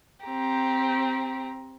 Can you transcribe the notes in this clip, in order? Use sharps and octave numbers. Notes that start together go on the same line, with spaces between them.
C4 G4 A#5